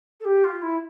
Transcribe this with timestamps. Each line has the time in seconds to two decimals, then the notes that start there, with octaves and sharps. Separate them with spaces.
0.20 A4
0.25 G4
0.44 F4
0.62 E4